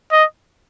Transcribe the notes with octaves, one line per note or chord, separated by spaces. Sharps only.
D#5